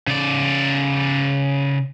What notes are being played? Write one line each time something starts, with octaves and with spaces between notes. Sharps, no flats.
C#3 D5